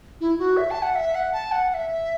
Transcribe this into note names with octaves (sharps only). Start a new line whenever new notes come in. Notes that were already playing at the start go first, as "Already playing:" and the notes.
E4
F#4
E5
A5
F#5
E5
F#5
A5
F#5
F#5
E5